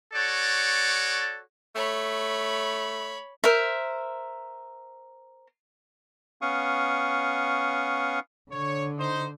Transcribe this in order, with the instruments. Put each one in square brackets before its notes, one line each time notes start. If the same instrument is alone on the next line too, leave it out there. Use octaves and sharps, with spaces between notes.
[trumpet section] F#4 A4 C#5 D5
[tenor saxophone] A3 [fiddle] C#5 B5
[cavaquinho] A#4 C5 E5
[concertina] B3 C#4 F5 C#6 D#6
[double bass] D3 [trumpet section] C#5
[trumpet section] D#4 C5